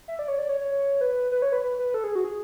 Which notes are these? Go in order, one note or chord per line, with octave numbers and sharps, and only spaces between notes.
E5
D5
C#5
D5
C#5
C#5
B4
B4
C#5
B4
B4
B4
A4
G#4
F#4
G#4